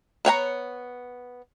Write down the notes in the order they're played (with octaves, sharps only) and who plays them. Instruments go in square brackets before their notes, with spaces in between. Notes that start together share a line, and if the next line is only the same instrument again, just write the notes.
[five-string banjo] B3 C#5 G5 A#5